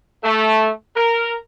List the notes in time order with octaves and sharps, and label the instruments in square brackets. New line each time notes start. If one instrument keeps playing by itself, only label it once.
[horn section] A3
A#4